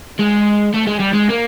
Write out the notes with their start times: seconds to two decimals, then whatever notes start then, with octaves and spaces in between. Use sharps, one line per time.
0.19 G#3
0.74 A3
0.87 G#3
0.99 G3
1.12 G#3
1.29 A#3